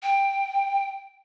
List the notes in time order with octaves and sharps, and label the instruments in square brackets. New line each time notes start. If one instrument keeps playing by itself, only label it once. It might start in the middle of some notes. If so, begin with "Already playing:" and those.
[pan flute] G5